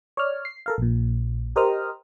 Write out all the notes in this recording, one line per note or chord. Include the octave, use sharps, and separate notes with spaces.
C#5 D5 F6
C7
A4 A#4 F5
A#1 A#2
G4 A#4 C5 D#5 D#6 F6